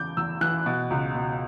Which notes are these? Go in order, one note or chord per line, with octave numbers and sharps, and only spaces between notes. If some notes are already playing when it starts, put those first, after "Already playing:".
Already playing: E2 C#3 E3 D6 G6
E2 E6
E3 F#6
B2
C#2
B2